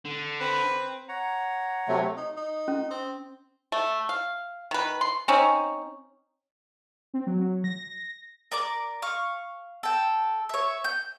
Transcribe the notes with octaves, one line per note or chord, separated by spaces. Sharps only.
D3
C4 B4
C#5 F#5 A#5
C3 F#3 A3
D#4
D#4
C#4
C4
A3
F5
D#3 B4
C6
C4 C#4 D#4
C4
F#3
F#3
A#6
A#4 D5 D6
F5 C#6
A4 G5
C#5 E5
G6